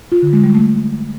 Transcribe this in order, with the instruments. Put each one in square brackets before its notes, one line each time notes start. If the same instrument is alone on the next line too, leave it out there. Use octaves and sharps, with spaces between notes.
[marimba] F4
D3
G#3
G3
A3